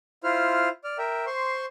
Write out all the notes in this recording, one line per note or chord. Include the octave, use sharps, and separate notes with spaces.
E4 F4 C5 F6
D5 F6
A#4 E5 G5
C5 C6 C#6